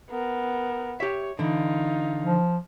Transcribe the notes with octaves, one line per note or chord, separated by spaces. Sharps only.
B3 A#4
G4 C#5 E5
D3 E3 D#4 F4
F3